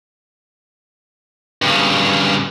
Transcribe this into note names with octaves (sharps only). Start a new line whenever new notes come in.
G2 C#3